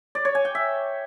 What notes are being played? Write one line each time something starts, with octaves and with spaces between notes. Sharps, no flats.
D5
C#5
G#5
G5
E5